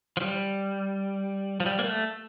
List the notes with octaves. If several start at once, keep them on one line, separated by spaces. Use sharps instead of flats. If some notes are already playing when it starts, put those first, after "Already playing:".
F3
G3
F3
G3
A#3
A3